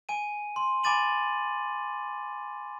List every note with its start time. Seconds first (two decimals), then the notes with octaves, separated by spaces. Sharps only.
0.09 G#5 D#7
0.56 C6
0.84 G#5 B5 D6 A6 D#7 F#7